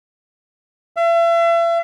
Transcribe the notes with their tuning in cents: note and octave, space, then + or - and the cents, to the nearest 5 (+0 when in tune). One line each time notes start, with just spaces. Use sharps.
E5 +40